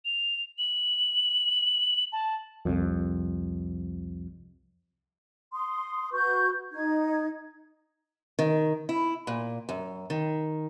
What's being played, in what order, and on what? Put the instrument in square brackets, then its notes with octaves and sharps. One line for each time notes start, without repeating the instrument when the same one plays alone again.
[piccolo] F7
F#7
A5
[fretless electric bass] C2 F2
[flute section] C6 D#6
F#4 B4 C#6 G6
D#4 G#6
[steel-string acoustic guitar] D#3
E4
A#2
F#2
D#3